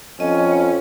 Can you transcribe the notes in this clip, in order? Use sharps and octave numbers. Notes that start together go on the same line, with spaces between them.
F2 C#4 D#5